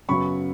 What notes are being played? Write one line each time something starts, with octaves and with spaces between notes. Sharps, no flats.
F#2 C#3 F#3 B3 B5 C#6